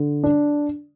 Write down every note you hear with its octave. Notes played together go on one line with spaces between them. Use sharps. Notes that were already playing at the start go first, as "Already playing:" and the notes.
Already playing: D3
D4